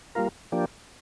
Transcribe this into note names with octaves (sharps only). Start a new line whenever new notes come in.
G3 A#3 F4 A#4
F3 A#3 D4 G4